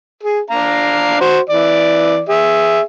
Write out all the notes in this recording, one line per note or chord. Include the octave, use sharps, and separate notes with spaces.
G#4
D4 F5 A#5
F#4 C5
E3 D5
G#4 E5